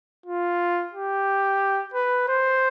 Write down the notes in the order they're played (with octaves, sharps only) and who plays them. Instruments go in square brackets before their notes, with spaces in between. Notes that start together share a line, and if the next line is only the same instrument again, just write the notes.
[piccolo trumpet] F4
G4
B4
C5